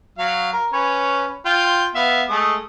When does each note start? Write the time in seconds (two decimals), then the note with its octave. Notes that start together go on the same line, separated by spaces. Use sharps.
0.18 F#3 F5
0.53 A#4
0.73 C#4 B4 C#5
1.46 F4 G5
1.95 B3 E5 F5
2.28 G#3 A3 D#6